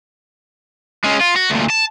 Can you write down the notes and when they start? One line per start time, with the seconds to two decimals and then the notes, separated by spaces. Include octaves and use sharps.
1.04 G#3 C#4
1.21 F4
1.36 F#4
1.50 D2 A#2
1.70 A5